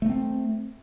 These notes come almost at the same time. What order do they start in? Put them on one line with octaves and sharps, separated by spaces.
A3 A#3 C4